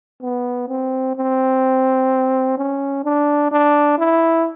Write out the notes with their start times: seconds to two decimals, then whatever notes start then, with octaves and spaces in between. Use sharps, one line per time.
0.22 B3
0.68 C4
1.16 C4
2.58 C#4
3.04 D4
3.51 D4
3.98 E4